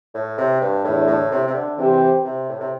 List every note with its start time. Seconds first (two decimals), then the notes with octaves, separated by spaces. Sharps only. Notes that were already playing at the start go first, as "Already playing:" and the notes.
0.14 A2
0.38 C3
0.61 G2
0.84 E2 A2 D3 A3 E4
1.07 A2
1.31 C3
1.47 C3
1.54 D3
1.78 C3 E3 C4 G4 C5
2.24 C3
2.48 A2
2.60 C3